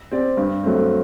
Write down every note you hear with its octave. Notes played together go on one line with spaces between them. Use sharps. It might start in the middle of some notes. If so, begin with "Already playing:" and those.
C4 G4 D5
G2
F#3 A3 C4